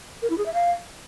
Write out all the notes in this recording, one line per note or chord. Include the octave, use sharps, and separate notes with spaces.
A#4
E4
G#4
E5
F5